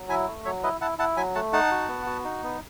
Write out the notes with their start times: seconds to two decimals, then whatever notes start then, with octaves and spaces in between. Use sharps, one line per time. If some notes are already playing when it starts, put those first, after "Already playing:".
Already playing: F#3
0.09 E4 E5 G#5
0.28 A3
0.45 F#3 C#5 E5
0.63 E4 B4 D#5
0.81 E4 F#5 A5
0.98 E4 F#5 A5
1.17 F#3 E5 G#5
1.35 A3 F#5 A5
1.53 D#4 F#5 A5
1.71 F#4
1.88 B3
2.06 F#4
2.24 D#4
2.43 B3